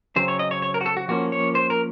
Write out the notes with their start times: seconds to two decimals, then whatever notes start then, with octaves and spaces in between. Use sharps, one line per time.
0.16 C#3 F#3 C4 C5
0.28 C#5
0.39 D#5
0.51 C#5
0.62 C#5
0.74 A#4
0.81 F#4
0.86 A4
0.97 F#4
1.08 F3 A#3 C#4 F#4
1.32 C#5
1.55 C5
1.70 A#4